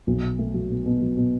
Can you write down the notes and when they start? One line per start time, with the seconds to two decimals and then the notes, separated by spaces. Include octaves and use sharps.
0.07 B1
0.22 B2
0.39 A3
0.54 F#3
0.70 B2
0.86 B2
1.01 F#3
1.17 B2